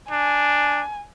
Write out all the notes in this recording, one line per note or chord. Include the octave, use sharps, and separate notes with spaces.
D4 G#5